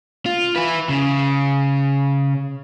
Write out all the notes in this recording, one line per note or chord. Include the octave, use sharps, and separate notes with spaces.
F4
E4 B4
C#3